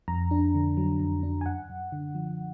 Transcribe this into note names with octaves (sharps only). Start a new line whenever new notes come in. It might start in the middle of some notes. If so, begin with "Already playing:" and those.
F2 A#5
D4
D3
F#3
F2
D4
G#5
F#2 F#5
F#2
D3
F3